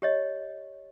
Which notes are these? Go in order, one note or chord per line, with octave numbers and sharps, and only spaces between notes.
G4 C#5 D#5